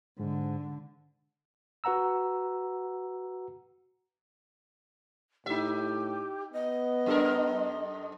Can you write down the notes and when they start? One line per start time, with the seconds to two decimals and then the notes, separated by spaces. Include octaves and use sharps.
0.19 G#2 D3
1.84 F#4 B4 F#5 A#5 E6
5.46 A2 D#4 G4 E5
6.53 B3 D#5
7.06 F#2 A4 A#4